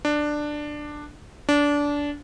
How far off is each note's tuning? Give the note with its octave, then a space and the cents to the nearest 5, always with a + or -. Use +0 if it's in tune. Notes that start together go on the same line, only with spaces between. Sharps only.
D4 +10
D4 -20